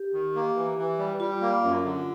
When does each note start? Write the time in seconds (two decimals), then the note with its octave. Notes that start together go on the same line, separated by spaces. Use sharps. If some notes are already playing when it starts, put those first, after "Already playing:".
Already playing: G4
0.13 D#3
0.36 A#3
0.56 E3
0.78 E3
0.99 G3
1.20 G3 F4
1.41 A#3
1.64 F#2
1.84 D3